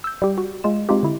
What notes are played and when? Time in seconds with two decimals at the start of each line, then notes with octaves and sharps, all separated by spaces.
0.04 E6 G6
0.22 G3 G4
0.38 F#4
0.64 G#3 F4 E7
0.89 G#3 C4 D#4 F4 G4
1.03 D3 E4